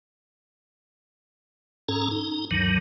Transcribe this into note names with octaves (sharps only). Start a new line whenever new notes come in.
G#2 C#4 A4 A#5
D#4
D2 G2 D#3 F#3